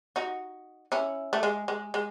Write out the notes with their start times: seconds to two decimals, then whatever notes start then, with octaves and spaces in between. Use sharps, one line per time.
0.16 D#4 F#4
0.92 C#4 E4
1.33 A3
1.43 G#3
1.68 G#3
1.94 G#3